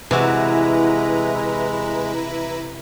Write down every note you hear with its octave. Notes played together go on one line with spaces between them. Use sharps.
C3 E3 G#3 E4 F#4 B4 A#5